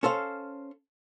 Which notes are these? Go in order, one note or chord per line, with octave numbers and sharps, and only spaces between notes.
C#4 A4 C5 F5